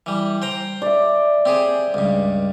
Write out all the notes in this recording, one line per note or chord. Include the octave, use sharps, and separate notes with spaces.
E3 G3
C5 G5 A#5
D5 E5
C4 G4 G#4
C#2 G2